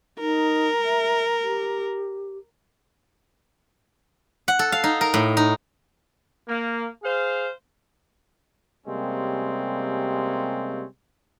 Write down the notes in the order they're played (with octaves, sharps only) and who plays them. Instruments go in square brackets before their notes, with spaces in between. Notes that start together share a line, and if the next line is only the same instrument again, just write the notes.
[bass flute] D#4 [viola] A#4
[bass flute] E5
G4
[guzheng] F#5
A4
F5
D#4
A#4
A2
D#4
[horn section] A#3
G#4 C5 F5
C3 G3 G#3 A#3 C4 C#4